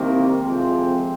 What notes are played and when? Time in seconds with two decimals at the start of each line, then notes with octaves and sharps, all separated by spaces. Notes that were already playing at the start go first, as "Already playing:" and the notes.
Already playing: C2 C3 D#3 A#3
0.41 F2 C3 F3 G#3 C4